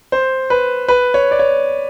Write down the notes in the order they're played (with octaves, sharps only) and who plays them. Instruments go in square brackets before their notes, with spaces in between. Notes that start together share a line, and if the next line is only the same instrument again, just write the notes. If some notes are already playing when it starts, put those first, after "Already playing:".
[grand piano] C5
B4
B4
C#5
D5
C#5